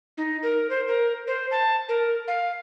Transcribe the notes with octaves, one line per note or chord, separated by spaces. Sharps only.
D#4
A#4
C5
A#4
C5
A5
A#4
F5